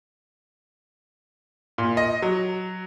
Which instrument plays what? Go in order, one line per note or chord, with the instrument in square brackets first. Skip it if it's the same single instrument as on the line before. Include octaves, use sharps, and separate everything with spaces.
[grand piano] A#2
D#5
F#3